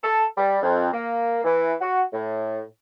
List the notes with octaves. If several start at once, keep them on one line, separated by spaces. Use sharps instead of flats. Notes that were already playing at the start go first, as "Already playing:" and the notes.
A4
G3
F2
A#3
E3
F#4
A2